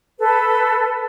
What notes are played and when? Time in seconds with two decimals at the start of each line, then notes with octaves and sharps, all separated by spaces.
0.19 A4 B4